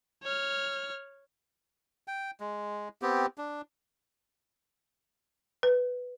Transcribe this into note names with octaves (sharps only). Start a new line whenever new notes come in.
C#5 F6
G5
G#3
B3 C4 G4
D4
B4